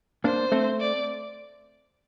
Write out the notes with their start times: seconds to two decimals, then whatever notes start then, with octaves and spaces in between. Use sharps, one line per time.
0.24 A#3 D4 C5
0.52 A3 C4
0.80 D5